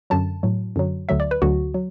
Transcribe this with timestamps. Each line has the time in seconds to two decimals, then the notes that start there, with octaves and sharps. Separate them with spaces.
0.10 F#2 D3 F#3 A5
0.43 A2 F#3
0.76 F#2 D3 F#3
1.09 D2 D3 F#3 E5
1.20 D5
1.31 B4
1.42 D2 D3 F#3 F#4
1.74 F#3